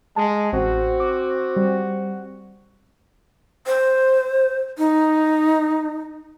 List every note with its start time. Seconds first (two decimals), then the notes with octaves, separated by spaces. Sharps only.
0.16 G#3 A5
0.52 A1 C4 F#4
1.00 D6
1.56 G3
3.67 C5
4.78 D#4